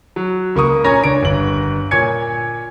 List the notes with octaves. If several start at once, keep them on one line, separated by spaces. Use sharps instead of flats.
F#3
C#2 A#3 C#6 D#6
A#2 C#4 C#5 G#5 A#5 A#6
C#2 D4 C#5 D7
G1 C#5 F#7
A#2 C#5 G#5 G#6 C#7